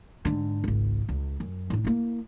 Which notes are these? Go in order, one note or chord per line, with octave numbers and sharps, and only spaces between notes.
G#2 D3
G#1 C#2
C#2
F#2
A2 D4
A#3 E4